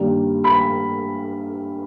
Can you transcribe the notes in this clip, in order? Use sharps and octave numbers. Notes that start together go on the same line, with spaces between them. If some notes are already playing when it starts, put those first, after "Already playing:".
Already playing: G2 D#3 G3 A#3
B5